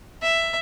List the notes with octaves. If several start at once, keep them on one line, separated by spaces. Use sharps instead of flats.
E5